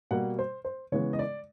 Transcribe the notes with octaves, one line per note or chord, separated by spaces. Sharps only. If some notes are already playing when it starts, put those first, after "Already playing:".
B2 G3 A#3 F#5
C5
C5
C#3 E3 G#3 B3 C#5
D#5
D5